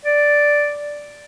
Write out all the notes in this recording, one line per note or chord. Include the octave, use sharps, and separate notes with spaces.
D5